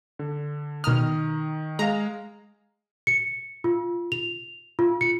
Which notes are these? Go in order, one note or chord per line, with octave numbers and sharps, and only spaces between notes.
D3
B2 D#3 A#5 D#6 F6
G#3 G#4 F5 A#5
C#7
F4
F7
F4
C#7